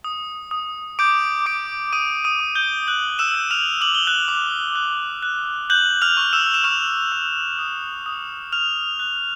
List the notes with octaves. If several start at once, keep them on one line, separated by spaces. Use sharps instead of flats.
D#6
D#6
D6 G6 D7
D6 G6 D7
D6 D#6 D#7
D#6 D#7
D6
G6 G7
F#6 G6 F#7
E6 E7
G6
F6 F7
D6 F#7
G7
F#6 F#7
D6
F#6
F#6
F#6 G6 F#7
F6 F7
C#6
E6 E7
E7
C#6 F6 F7
E6
D#6
D#6
F6 F#6 F7
F#6